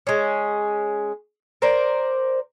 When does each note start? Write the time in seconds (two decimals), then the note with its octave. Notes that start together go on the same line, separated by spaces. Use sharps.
0.07 G#3 C#4
1.62 A#4 C5 D5